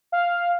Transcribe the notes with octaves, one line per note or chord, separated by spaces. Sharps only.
F5